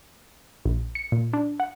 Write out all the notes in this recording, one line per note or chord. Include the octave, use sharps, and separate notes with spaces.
A#1
C#7
A#2
D4
F#5